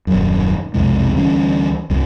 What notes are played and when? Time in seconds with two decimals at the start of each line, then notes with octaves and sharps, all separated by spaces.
0.07 D#1 F#2
0.74 B1 F2 C3 G#3
1.16 D2 E3 G3 C#4
1.90 C2 G2